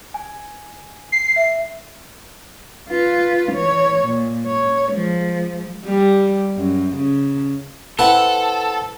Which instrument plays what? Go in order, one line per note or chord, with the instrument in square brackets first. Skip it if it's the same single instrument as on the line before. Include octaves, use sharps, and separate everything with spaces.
[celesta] G#5
[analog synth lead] C7
[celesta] E5
[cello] F4 B4
E3 C#5
A#2
C#5
F3 G#3
[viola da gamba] G3
F#2
C#3
[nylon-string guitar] C4 B4 [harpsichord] E4 F#5 A5 [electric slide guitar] A4